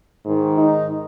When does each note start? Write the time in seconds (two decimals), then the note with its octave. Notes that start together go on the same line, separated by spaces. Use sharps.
0.25 G#2 D#3
0.58 D#4